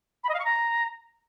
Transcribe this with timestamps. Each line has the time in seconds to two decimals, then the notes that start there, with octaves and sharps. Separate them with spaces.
0.24 B5
0.29 D#5
0.34 F5
0.39 C#6
0.45 A#5